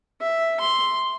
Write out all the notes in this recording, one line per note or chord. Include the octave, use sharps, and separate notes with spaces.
E5
C6